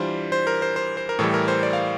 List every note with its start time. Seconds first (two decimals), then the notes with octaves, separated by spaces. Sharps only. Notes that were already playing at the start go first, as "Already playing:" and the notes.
Already playing: E3 G3 D4 F4 C5
0.32 C5
0.47 A#4
0.62 C5
0.76 C5
0.97 C5
1.09 A#4
1.19 A2 E3 G3 A4
1.34 A#4
1.48 C5
1.63 D5
1.73 F5